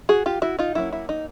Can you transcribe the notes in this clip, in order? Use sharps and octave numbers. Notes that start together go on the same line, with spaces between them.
F#4 G#4
F4 G4
E4 F#4
D#4 F4
F#3 A#3 C#4 E4
E4
D#4